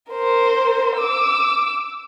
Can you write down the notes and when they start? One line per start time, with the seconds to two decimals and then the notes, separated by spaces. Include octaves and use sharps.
0.11 A#4 C5
0.97 D6 E6